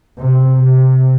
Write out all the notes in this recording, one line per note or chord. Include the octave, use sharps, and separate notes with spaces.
C3
C3